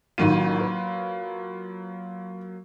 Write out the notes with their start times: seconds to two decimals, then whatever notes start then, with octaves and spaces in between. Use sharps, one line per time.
0.18 A1 D#3 F#3 A#3 F4 D#7
0.61 B4